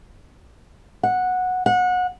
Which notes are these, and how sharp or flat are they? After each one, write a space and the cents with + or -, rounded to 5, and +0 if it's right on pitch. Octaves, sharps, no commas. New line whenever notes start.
F#5 -10
F#5 -25